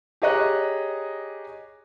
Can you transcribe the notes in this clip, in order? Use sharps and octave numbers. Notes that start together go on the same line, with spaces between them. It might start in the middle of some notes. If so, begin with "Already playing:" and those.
G4 G#4 C#5 D#5 A#5 F#6